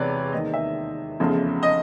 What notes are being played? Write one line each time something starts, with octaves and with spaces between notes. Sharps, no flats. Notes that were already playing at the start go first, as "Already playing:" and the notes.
Already playing: E1 E2 C3 E3 B4 C#5 D5
E1 D#2 D#3 D#5
E5
F1 E2 C#3 F3
D#5